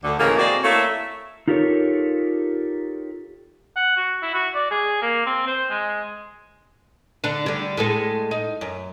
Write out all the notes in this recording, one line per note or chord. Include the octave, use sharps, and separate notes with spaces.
D2 D3
A2 C#3 E3 G#3 A#3
G#3 A#3 C4 F#4 D5
A3 A#3 E4 A4 C#5 E5
D#4 F4 G4 A4 A#4 C#5
F#5
F#4
E4
F#4
D5
G#4
A#3
C4
C5
G#3
D3 D4
D3 G3
A2 G#3 A4
D#4
F#2